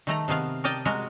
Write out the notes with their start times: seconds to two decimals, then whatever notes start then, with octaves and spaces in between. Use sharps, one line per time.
0.07 D#3 A3 A#5
0.28 C3 D#3 B3 F5
0.64 A#4 D5 D#5 G5 A5
0.85 G#3 F#4 A#4